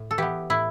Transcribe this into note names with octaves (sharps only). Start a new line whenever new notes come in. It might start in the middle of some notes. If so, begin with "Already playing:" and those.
Already playing: A2
A4
E3 B3 G4
A2 E4